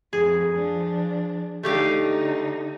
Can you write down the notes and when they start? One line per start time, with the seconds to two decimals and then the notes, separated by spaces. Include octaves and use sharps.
0.13 F2 G#4
0.56 F3 D4
1.63 D3 A3 D#4 G4 F5